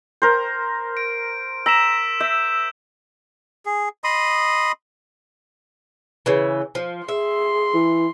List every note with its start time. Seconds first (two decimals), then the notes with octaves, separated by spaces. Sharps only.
0.22 A#4 C5
0.97 D7
1.66 A#5 E6 B6 E7
2.20 E5 G6
3.66 G#4
4.04 D#5 B5 C6 D#6
6.26 C#3 E3
6.75 F3
7.08 G#4 E5 C6
7.74 E3